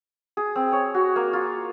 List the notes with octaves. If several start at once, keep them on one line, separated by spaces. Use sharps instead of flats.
G#4
C4
C#5
F#4
A#3
F4